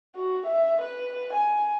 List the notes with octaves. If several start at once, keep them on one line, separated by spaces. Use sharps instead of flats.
F#4
E5
B4
G#5